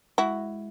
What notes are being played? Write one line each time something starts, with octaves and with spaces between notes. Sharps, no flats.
G#3 E4 F#4